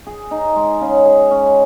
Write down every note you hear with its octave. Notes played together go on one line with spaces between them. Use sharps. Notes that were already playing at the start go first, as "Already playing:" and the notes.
G#4
D#4
G#3
C#3
G#4
C#4